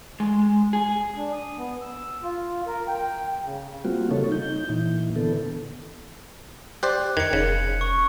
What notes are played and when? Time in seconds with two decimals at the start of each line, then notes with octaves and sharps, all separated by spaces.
0.20 G#3
0.73 G#4
1.17 D4
1.33 D#6
1.58 B3
1.81 E6
2.23 F4
2.67 A#4
2.88 G5
3.44 C#3
3.85 G3 A#3 C4 F4 F#4
4.11 C#3 G3 D#4 A4 C#5
4.32 D#4 G6
4.69 A#2 E3
5.16 D3 E3 B3 A4
6.83 G4 C5 D5 F#6
7.17 F2 D#3 G#6 C#7
7.33 F1 C#3
7.81 C#6